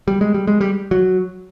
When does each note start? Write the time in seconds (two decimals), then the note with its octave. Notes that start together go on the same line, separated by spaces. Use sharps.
0.08 G3
0.21 G#3
0.34 G3
0.47 G#3
0.61 G3
0.91 F#3